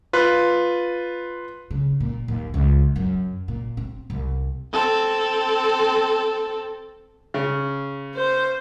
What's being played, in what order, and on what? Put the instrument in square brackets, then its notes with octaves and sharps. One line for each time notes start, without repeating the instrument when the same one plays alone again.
[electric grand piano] F4 B4
[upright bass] C#3
A#2
D#2
C#2
F#2
A#2
C4
C2
[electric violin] C4 A4
[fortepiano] C#3
[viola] C5